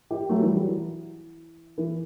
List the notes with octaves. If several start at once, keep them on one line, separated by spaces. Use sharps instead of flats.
E4 G4
F#3 A3
E3 G3
F#3
E3
E3